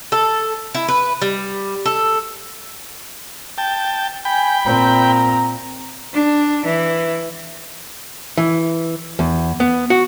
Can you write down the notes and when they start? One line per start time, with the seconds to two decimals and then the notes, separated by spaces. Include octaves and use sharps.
0.12 A4
0.74 E4
0.88 B4
1.22 G3
1.86 A4
3.58 G5 A5
4.25 G5 G#5 B5
4.64 A#2 C4 A#5
6.14 D4
6.65 E3
8.38 E3
9.19 E2
9.60 B3
9.90 F#4